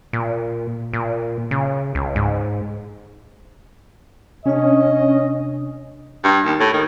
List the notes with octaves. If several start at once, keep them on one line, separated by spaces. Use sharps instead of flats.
A#2
A#2
C#3
C#2
G#2
C3 C#4 D4 D#5
G2
D#2
A2
D#3